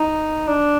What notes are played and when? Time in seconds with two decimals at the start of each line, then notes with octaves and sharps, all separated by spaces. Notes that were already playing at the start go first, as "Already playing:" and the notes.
Already playing: D#4
0.48 D4